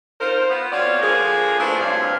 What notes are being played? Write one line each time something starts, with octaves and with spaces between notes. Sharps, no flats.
D#4 F4 A#4 C5
B3
F3 C4 F4 F#4 C#5 D5
D3 F3 A#3 G#4
A3 D4 E4 F4 B4 C5
D2 G2 C3 D4 C#5 F5